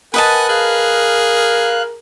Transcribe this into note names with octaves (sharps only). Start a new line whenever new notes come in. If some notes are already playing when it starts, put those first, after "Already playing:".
A#4 B4 D#5 F#5 G#5 A5
G#4 F5 F#6